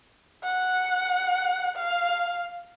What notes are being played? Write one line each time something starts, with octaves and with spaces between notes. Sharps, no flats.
F#5
F5